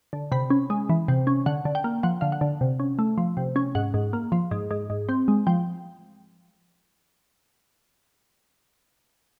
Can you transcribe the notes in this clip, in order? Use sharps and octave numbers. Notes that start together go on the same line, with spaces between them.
D3
C3 B5
C#4
G#3
E3
C3
C#4
D3 F#5
D3
G5
A#3
F3 F#5
D3 F5
F#5
D3
C3
C#4
A3
F3
C3
C#4
G#2 F#5
G#2
A#3
F3
G#2
G#2
G#2
C4
G#3
F3 G5